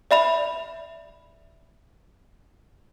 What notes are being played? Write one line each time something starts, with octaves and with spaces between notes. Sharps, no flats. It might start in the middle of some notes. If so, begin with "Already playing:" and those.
D5 E5 B5 F7